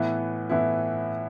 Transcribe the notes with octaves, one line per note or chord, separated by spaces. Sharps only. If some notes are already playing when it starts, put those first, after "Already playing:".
Already playing: A2 E3 B3 E4
A2 E3 B3 E4